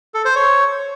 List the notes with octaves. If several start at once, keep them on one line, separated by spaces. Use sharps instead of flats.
A4
C5
C#5